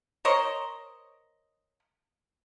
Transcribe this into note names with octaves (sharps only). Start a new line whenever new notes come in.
A#4 C5 C#5 D#5